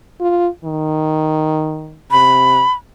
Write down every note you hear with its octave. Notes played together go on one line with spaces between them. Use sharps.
F4
D#3
C3 B5